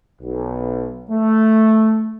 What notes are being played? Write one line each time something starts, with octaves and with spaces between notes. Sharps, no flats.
B1
A3